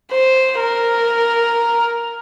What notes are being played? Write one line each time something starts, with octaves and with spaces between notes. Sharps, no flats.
C5
A#4